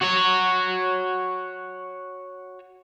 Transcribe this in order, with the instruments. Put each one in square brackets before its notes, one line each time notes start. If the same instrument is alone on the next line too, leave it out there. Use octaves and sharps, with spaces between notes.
[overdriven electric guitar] F#4 C#5